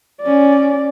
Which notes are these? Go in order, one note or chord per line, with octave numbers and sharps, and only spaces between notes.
C#4 D5